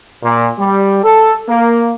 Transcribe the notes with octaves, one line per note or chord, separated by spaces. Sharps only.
A#2
G3
A4
A#3